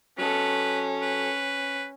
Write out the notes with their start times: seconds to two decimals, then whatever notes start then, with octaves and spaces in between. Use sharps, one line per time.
0.18 F#3 C#4 A4 B4
1.02 B4